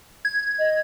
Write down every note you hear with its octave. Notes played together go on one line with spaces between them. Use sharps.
G#6
D#5